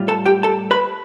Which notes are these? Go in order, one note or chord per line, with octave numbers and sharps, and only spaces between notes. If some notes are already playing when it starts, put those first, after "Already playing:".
Already playing: A2 G3 F4
A4 A5
G4 G5
A4 A5
B4 B5